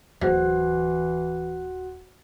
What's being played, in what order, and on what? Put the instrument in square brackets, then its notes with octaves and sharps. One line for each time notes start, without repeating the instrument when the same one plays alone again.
[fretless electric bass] D1 [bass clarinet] E3 [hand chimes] F#4 F#5 F#6 [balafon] C5